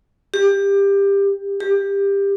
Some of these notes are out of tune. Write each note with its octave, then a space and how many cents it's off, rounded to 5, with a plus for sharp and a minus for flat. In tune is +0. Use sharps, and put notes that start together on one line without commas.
G4 +20
G4 +20